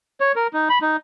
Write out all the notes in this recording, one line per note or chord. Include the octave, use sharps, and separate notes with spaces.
C#5
A#4
D#4
B5
D#4